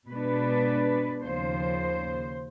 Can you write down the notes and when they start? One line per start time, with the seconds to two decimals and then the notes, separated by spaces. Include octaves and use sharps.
0.10 B2 G#3 B3 D4 B4
1.24 D#2 C#3 F3 C5